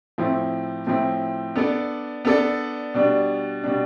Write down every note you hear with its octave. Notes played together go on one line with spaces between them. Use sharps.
A2 F3 C4 E4
A2 F3 C4 E4
B3 D4 A4 D5
B3 D4 A4 D5
B2 G3 D4
B2 G3 D4